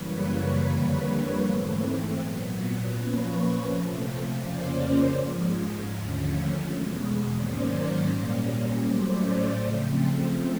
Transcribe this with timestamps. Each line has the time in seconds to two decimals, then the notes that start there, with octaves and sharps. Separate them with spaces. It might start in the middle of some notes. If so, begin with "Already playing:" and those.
Already playing: F#2 C#3 E3 G3 A#3 B4 C#5
0.66 F2 D3 G3 A#3
1.41 G#2 E3 A3 C4
2.15 A#2 F#3 B3
2.89 A#2 F3 A#3 C#4 B4 C#5
3.63 C3 F3 A3
4.37 F2 C#3 F3 A#3 C#4 C5 D5
5.13 G#2 F3 G#3
5.87 D#2 D3 F3 A3 C#4
6.61 E2 B2 G#3
7.35 G#2 D#3 F#3 A#3 C#4 C5 D5
8.10 A#2 G3 A#3 C#4
8.83 A2 F#3 A3 C#4 C5 D5
9.59 C#3 F3 A3 C4